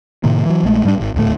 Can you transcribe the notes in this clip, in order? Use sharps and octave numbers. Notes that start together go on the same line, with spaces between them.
A2 C3 D#3 A#3
E3 F#3
A#1 G#3 A3
G#2 G3 A3 D4
D#1 G#1
D#1 D2 A2 A3